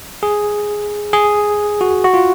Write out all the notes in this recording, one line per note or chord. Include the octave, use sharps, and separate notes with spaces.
G#4
G#4
F#4
F#4
F4